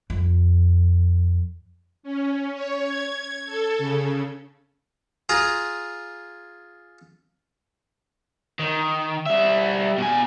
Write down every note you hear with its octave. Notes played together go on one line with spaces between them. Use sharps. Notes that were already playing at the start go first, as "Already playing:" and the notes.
F2
C#4
C#5
G#6
A4
C#3
F4 G#4 A#5 C6
D#3
G3 E5
B2 G#5